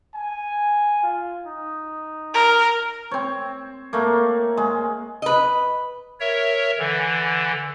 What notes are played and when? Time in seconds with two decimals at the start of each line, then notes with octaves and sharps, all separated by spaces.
0.15 G#5
1.03 F4
1.46 D#4
2.34 A#4
3.11 C4 C#5
3.93 A3 A#3
4.57 G#3
5.22 B4 D#5
6.20 A#4 C#5 E5
6.79 D3 E3